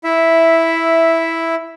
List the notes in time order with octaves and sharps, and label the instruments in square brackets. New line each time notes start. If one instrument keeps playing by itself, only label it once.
[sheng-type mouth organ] E4 E5